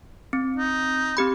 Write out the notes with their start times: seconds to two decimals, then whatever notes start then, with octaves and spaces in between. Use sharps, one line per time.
0.33 C4
0.56 D#4
1.17 C4 G4 B5